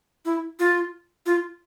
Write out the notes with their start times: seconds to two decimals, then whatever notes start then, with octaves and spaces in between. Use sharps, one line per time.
0.25 E4
0.60 F4
1.26 F4